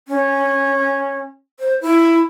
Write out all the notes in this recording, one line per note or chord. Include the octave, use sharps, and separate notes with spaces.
C#4
C5
E4